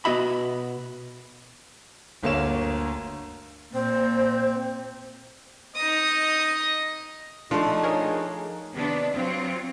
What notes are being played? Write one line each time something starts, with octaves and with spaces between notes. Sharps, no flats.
B2 B3 F#4 D#5 E5 B5
G1 D2 A#3 C#5 E7
A#2 C4 C5
D#4 D#5 D#6
F3 A3 D4 D#4
G#4 A#4 C#5
C3 D#3 B3 D4
F#3 C4 F4